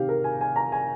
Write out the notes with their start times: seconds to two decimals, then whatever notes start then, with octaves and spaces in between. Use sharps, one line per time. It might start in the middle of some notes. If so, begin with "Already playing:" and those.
Already playing: C3 D#3 G4 F5
0.09 A#4
0.24 G#5
0.41 G#5
0.56 A#5
0.72 G#5